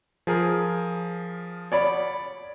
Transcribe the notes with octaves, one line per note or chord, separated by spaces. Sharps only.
F3 G#4 A#4
C#5 D5 B5